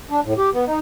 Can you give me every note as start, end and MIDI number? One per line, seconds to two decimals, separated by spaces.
0.10 0.20 62
0.25 0.34 45
0.38 0.50 67
0.54 0.65 59
0.67 0.79 63